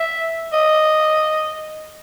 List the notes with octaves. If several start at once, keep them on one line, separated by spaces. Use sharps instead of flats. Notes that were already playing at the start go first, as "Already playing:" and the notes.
Already playing: E5
D#5